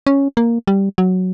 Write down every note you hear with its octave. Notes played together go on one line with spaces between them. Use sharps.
C#4
A#3
G3
F#3